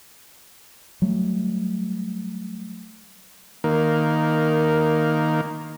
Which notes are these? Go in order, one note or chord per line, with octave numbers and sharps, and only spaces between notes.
F#3 G3 A3
D#3 A#3